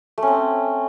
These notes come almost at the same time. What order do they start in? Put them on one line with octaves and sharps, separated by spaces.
A3 C#4 C4